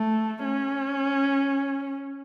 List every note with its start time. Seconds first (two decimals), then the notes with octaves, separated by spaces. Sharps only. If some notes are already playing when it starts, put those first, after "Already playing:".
Already playing: A3
0.44 C#4